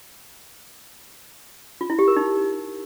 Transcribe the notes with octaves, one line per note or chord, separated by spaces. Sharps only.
F4
E4
G4
A#4
D#4